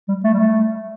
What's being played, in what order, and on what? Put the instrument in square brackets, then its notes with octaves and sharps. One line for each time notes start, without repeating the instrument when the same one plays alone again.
[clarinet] G3
A3
G3
A3